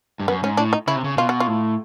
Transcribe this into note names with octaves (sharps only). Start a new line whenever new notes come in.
G2
F#2 B3
G#2 C#4
A2 D4
D#4
C#3 E4
C3
C#3
B2 F4
F#4
F4
A2